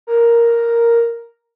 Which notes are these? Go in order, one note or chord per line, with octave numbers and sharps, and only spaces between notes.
A#4